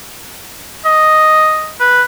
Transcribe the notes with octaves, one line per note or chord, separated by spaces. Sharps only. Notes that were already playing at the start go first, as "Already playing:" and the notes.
D#5
B4